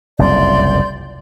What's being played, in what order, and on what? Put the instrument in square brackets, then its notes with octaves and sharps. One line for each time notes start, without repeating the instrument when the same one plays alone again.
[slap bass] F#1 C2 F2 [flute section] D5 C6 G6